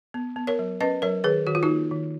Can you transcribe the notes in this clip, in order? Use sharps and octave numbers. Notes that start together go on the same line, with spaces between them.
B3
B3
A#4 C#5
F#3
C#4 B4 D#5
F#3 A#4 C#5
D#3 G#4 B4
D#3 F#4
F4
D#4 F#4
A#3
D#3